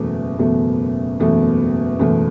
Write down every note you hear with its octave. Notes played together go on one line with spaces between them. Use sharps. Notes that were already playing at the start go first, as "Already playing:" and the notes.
Already playing: F#1 E2 B2 A3
F#1 E2 B2 A3
F#1 E2 B2 A3
F#1 E2 B2 A3